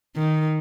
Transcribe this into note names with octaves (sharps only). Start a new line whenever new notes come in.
D#3